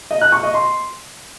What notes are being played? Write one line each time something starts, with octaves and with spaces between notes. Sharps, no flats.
D#5
F#6
C#6
D#5
C6